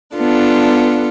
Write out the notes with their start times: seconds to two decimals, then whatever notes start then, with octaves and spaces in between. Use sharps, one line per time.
0.17 B3 D4 F4 A4